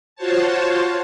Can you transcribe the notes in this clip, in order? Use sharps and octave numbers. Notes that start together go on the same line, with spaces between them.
F4 F#4 C5 C#5 A5